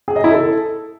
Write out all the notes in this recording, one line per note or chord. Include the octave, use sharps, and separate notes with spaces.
G#4
D#5
E4
A4